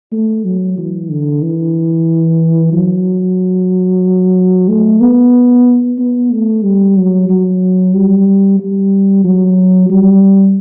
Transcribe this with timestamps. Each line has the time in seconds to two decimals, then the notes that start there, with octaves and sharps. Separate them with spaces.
0.12 A3
0.45 F#3
0.78 E3
1.10 D3
1.42 E3
2.73 F#3
4.68 A3
5.01 B3
5.98 B3
6.32 A3
6.64 G3
6.97 F#3
7.29 F#3
7.94 G3
8.59 G3
9.24 F#3
9.90 G3